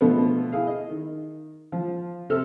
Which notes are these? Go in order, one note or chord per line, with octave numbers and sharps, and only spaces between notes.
B2 D3 F3 A3 B3
E4 G#4 F5
D#5
D#3
F3
C3 C4 A4 F6